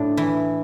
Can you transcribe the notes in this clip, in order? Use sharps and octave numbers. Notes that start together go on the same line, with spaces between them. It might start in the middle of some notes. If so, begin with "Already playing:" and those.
Already playing: A2 D4
E3